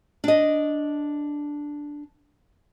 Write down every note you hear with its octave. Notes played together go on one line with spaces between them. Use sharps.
D4 D#5